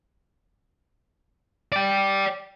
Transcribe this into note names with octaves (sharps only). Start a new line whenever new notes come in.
D5 G5